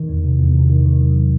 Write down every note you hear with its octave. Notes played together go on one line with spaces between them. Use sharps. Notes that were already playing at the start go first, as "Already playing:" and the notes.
Already playing: D#3
E2
C3
E2
C3
D#3
D#3
F#3